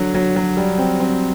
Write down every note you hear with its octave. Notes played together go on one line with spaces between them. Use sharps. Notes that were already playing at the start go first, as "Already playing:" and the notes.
Already playing: D3 F#3
F#3
F#3
G3
C4
C4